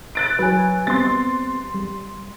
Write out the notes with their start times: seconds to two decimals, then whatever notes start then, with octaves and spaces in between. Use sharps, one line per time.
0.15 F#6 A6 D7
0.39 F#3 B4 G#5
0.87 G3 B3 C4 C6 A6
1.75 G3